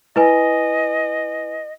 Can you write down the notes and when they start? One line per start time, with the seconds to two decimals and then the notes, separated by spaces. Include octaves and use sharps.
0.16 E4 B4 D#5 G#5